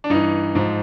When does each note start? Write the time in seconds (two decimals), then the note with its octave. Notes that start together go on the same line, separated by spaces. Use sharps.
0.04 D4
0.10 G2 E3 D#4
0.55 G#2 F3